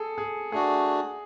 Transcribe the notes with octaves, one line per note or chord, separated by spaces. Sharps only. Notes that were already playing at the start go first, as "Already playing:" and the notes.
Already playing: G#4 A4
G#4
A3 D4 F#4 G#4